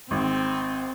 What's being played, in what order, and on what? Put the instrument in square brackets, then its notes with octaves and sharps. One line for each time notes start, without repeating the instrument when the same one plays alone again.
[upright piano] G#1 [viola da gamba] C4